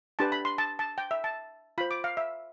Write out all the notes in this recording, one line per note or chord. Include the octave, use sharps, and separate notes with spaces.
D4 G4 B4 A5
B5
C6
A5
A5
G5
E5
A5
F4 C5 B5
D6
F5
E5